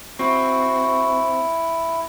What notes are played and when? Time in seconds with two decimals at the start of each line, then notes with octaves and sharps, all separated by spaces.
0.19 C4 E4 F#4